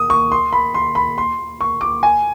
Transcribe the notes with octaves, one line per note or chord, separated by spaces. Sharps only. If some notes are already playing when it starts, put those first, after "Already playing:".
Already playing: D#6
C#6
C6
B5
C6
B5
C6
C#6
D6
G#5